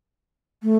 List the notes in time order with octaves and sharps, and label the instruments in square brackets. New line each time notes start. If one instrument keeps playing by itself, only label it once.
[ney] A3